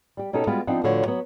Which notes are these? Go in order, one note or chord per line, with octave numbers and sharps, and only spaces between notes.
G3 G4
B2 C#4 D#4 G4 A4
G3 G#3 B3 F4 F#4
F3 B3 C4 D4 D#4 F#5
A2 D3 F3 F#4 B4 C#5
F#3 B3